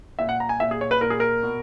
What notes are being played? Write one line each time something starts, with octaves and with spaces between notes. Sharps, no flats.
A#2 E5
F#5
A#5
G#5
A#2 E5
G#4
C#5
B4
A#2 A#4
G#4
A#4
B2